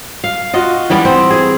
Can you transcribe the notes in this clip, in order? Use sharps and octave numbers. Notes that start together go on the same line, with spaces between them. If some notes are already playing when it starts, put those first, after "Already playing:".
F5
F4 F#4 D#5
E3 G3 B3 D5
C4
G#4